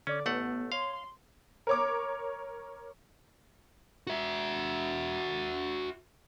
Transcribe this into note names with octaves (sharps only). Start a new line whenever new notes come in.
D3 C#4 D5 D6
A1 A3 B3 F#5
C#5 F5 C6
C6
A#4 C#5 D6
F#4 E5